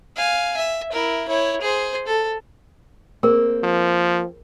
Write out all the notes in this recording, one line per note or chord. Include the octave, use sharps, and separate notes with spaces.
F5 G#5
E5
E4 A#4
E4 C#5
G#4 C5
A4
A#3 C4 G#4 A#4
F3